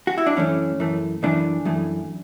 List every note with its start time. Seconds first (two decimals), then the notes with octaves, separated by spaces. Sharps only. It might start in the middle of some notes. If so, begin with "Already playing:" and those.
0.07 F#4
0.18 E4
0.27 D4
0.37 F#2 E3 A3 C#4
0.80 F#2 E3 A3
1.23 F#2 E3 A3 D4
1.65 F#2 E3 A3